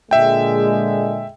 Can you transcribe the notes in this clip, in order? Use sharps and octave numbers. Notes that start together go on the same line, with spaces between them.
A#2 D3 G#3 E5 G5